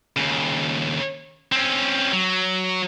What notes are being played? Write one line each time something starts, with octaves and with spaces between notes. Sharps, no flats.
D#2 C#3
C4 C#4
F#3